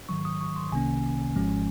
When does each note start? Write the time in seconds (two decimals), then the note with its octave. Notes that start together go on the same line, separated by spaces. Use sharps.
0.09 G#2 D#3 F#3 C#6
0.25 D#6
0.41 C#6
0.56 C6
0.72 C2 C3 D#3 A#3 C#4 G#5
1.36 G#1 G#2 F3 G#3 C#4